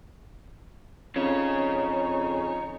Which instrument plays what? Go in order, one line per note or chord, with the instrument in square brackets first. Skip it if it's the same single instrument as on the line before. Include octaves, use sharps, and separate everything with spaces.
[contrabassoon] F2 [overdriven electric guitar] C#3 [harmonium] D#4 [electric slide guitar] C#5